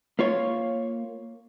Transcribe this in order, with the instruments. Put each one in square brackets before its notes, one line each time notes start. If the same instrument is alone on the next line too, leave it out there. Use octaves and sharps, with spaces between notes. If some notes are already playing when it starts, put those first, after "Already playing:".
[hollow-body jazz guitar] A#3 F4 C#5